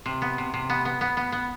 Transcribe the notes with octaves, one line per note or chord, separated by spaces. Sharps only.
C3
B3
C3
C3
B3
B3
B3
B3
B3